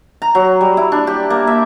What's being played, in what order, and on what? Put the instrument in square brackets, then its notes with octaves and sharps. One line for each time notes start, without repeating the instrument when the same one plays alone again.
[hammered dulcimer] A#5
F#3
G3
E4
D4
G4
A#3
E5